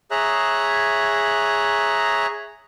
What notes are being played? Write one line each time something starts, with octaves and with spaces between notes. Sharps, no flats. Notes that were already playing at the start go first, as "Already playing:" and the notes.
G#4 C#5 E5 A#5 F#6